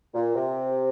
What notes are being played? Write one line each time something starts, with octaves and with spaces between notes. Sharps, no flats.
A#2
C3